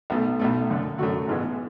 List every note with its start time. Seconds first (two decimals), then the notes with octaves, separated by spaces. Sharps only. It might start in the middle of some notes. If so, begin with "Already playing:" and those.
0.10 B1 B2 A3
0.39 B1 B2 A3
0.70 F#2 D3 A3
0.98 F#2 D3 A3 F#4
1.28 A1 G#2 G#3 B3